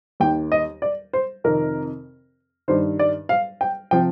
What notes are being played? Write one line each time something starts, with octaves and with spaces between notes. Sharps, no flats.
D#2 D#3 G5
D#5
D5
C5
F2 C3 D#3 A#4
G2 D#3 C5
D5
F5
G5
C3 F3 G5